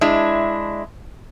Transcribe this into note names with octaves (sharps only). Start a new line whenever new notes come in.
G#3 D4 E4